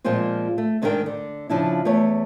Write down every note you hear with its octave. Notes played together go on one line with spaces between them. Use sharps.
A#2 F3 G#3 A#3 C4 F4
A3
G#2 D#3 D4 G#4 A#4 G5
D3
C#3 F3 D4 E4
E2 A3 B4 C#5